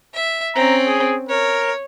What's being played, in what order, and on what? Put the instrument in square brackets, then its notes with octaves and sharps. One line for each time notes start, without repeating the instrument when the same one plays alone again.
[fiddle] E5
[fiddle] C4 C#4 [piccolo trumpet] A#5
[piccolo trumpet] G#4
[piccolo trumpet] A#4 [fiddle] C#5